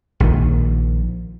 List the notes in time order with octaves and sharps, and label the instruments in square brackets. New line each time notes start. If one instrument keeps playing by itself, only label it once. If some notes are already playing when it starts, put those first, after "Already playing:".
[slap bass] A#1 A#2 D#3